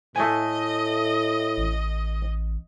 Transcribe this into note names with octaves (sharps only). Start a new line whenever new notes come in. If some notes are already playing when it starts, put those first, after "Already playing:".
A2 A3 D#5 G#5
A1